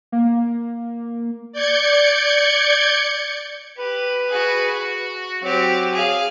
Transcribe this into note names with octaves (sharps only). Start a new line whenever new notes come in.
A#3
D5 G6 G#6 C#7
G4 B4
F#4 G#4
F#4
F#3 C4 G4
G#4 F5